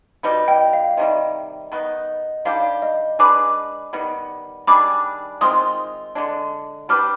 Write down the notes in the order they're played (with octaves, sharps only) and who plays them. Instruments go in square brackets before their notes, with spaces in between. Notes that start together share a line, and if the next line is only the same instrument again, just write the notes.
[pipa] B2 G3 B3 D#4
[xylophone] D#5 G5
F5
[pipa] C3 D#3 G3 [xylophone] D#5
[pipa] D#3 B3 D#4
[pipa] D#3 G3 D4 G4 [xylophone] F5
[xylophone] D#5
[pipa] G#3 D4 G#4 B4 [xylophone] B5 D6
[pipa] D#3 G3 B3
[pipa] D#3 G3 D4 G#4 [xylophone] B5 D6
[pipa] D#3 G#3 C4 F4 [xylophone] C6 D#6
[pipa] D3 G#3 D4
[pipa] G3 D4 G4 B4 [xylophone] D6 F6